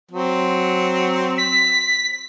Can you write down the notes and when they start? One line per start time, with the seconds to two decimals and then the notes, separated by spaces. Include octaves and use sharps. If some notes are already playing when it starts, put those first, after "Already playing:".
0.11 F#3 C4
1.38 B6